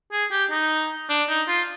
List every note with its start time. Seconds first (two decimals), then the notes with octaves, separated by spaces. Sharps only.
0.12 G#4
0.31 G4
0.51 D#4
1.09 D4
1.29 D#4
1.48 F4